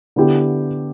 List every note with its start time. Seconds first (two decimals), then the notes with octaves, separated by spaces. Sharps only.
0.16 D3 B3 E4 G4